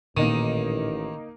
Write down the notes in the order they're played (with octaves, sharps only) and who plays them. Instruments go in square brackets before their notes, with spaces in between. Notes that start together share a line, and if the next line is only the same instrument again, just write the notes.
[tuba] A1 [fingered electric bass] A#2 [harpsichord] D#3 [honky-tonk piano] A#3 D#4 D#7